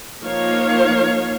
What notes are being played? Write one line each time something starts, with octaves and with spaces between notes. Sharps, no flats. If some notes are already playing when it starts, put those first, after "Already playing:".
F3 A#3 D#4 C#5 F5